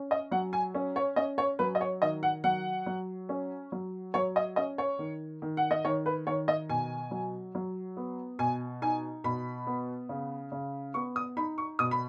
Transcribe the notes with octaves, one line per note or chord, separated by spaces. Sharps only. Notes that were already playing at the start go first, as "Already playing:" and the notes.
Already playing: C#4
D#5
F#3 F#5
G#5
C#4
C#5
C#4 D#5
C#5
F#3 B4
D#5
C#5
D#3 D#5
F#5
F#3 F#5
F#3
C#4
F#3
F#3 C#5
D#5
C#4 D#5
C#5
D#3
D#3
F#5
D#5
D#3 C#5
B4
D#3 C#5
D#5
B2 G#5
F#3
F#3
B3
B2 G#5
D#4 G#5
B2 B5
B3
C#3
C#3
B3 C#6
D#6
D#4 B5
C#6
B2 D#6
B5